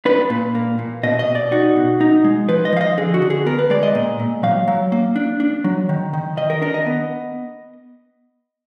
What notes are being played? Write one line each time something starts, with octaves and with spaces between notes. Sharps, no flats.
D4 B4
A#2
A#3
A#2
B2 D#5
D#5
B2
D5
D#4 F#4
B2
D#4
G#3
F3 B4
D#5
F3 F5
D#5
D3 G#4
F#4
D3
G#4
B3 A#4
B4
G#3 D5
D#5
A#2
A#2
F#3 F5
F#3
A#3
D4
D4
F#3
D#3
D#3
D#3 D#5
A#4
D4 A#4
D#5
B3